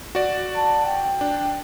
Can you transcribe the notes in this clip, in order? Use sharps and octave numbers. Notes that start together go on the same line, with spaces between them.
F#4 D5
A5
G5
D4